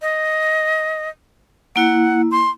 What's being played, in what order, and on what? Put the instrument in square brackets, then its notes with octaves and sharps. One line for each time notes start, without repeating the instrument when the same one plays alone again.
[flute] D#5
[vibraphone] A#3 E4 [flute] F#5
[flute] C6